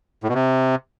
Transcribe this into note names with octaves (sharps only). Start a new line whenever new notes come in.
A2
B2
C3